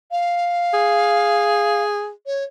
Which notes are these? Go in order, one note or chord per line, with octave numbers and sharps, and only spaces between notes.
F5
G#4
C#5